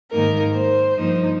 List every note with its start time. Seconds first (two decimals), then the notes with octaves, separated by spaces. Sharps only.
0.10 G#2 D#3 A#3 D#4 A#4
0.53 C5
0.96 G2 F3 A#3 D#4